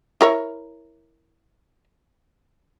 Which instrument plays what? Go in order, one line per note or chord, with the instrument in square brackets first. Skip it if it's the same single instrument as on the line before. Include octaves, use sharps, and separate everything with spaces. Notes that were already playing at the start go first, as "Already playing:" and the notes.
[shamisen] E4 A#4 C#5